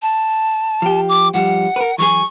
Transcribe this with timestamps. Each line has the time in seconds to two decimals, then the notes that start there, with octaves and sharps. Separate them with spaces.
0.02 A5
0.82 F3 G4
1.09 D6
1.34 G2 F3 G3 F#5
1.76 A#4 B4
1.98 E3 F#3 G#4 C#6